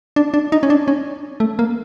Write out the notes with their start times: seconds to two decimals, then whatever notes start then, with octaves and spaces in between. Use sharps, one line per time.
0.16 D4
0.34 D4
0.52 D#4
0.63 C#4
0.70 D4
0.88 C#4
1.40 A3
1.59 A#3